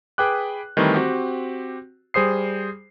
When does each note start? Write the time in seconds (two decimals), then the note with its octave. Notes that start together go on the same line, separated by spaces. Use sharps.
0.18 G#4 B4 G5 D6 F#6
0.77 D#3 E3 G3 A3 C4
0.94 C4 F#4 G4
2.14 G3 G#4 C5 D#6 C7